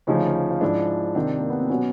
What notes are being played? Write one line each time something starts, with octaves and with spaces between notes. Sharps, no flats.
D2 C#3 F3 C#4 D#4
F4
G#2 F3 D4 E4
C2 C3 D#3 C4 D4
A#3
B3
C4
B2 F#3 B3 C#4